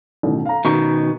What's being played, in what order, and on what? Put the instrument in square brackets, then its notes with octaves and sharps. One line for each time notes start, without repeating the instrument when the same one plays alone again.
[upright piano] A1 B2 D#3
F5 A#5
[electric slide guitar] B2 D#3 [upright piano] A#5 C#6